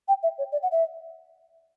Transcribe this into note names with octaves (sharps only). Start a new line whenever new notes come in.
G5
E5
C#5
D5
F#5
E5